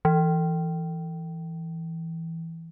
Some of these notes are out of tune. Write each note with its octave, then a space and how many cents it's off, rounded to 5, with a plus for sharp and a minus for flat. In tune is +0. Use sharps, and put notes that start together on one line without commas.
E3 +0